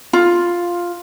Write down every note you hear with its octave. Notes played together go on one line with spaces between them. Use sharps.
F4